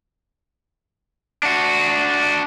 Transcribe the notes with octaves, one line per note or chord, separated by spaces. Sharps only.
D4 F#4